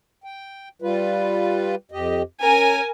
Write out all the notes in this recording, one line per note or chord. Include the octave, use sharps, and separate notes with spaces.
G5
G3 F4 B4
F2 G4 D#5
C#4 A#4 G#5